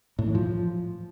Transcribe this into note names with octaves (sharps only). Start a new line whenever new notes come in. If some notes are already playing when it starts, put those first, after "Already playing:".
A2
E3
F3